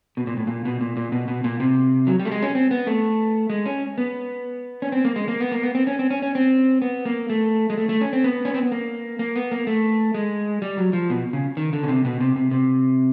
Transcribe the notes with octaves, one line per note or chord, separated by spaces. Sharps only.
B2
A#2
A2
A#2
B2
A#2
A#2
B2
B2
A#2
C3
F#3
G3
A3
G#3
C#4
C4
B3
A3
G#3
C#4
B3
C#4
C4
A#3
G#3
A#3
B3
A#3
B3
C4
C#4
C4
C#4
C#4
C4
B3
A#3
A3
G#3
A3
A3
C#4
C4
B3
C#4
C4
B3
A#3
A#3
B3
A#3
A3
G#3
G3
F#3
F3
B2
C#3
D#3
D3
C#3
C3
B2
C3
C3
C3